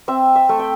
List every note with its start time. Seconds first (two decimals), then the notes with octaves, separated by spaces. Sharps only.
0.08 C4 E5
0.35 E5
0.49 A3
0.59 G5